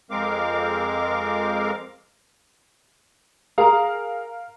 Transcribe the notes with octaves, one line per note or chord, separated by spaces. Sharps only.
F2 G#3 C4 A#4 F5 D6
G#4 A#4 F5 A#5